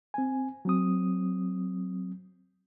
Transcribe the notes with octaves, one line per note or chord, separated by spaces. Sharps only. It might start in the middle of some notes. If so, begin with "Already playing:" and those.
C4 G#5
F#3 C4 D#6